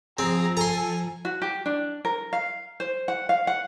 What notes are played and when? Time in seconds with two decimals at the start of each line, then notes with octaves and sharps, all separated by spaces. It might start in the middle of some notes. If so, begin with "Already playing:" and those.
0.19 F3 C4 G#4 A#5
0.57 A4 G#5 A#5 C6
1.25 F#4
1.42 G4
1.66 D4
2.05 A#4
2.33 F5
2.80 C5
3.08 F#5
3.29 F5
3.47 F#5